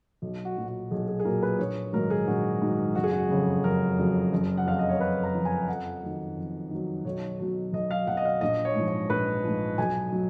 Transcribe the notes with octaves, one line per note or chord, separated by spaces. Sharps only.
B1
F#4
A#2 F#3
F#4
B1 G#4
G#4
G#4
A#2 F#3 A#4
B4
A#1 C#5
G#2 D#3 F#3 A#4
G#4
A#1 F#4
G#2 D#3 F#3
F#1 F#4
G#4
F#4
F2 C#3 F#3
F#1 A#4
F2 C#3 F#3
F#1
F#5
F2 F3 F5
D#5
C#5
F#1 B4
A#5
F2 F3
G#5
F2 F#5
D#3 F#3
F2
D#3 F#3
B1 C#5
B2 F#3
B1 D#5
F5
B2 F#3 F#5
D#5
F5
A#1 D#5
C#5
G#2 F3
C#5
A#1 B4
G#2 F3
B1 G#5
F#3